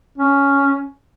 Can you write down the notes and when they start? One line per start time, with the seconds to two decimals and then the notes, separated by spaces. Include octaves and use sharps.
0.18 C#4